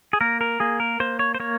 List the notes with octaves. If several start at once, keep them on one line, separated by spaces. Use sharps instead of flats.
G#4
A#3 A#4
A#4
A#3 G#4
A#4
A#3 C5
C#5
C5
A#3 C#5